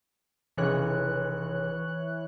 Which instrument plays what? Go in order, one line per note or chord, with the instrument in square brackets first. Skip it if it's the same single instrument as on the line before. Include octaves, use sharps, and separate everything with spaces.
[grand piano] F1 C#3 [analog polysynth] E3 C#5 F#6